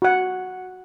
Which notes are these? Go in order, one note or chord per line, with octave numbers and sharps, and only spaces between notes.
F#4 F#5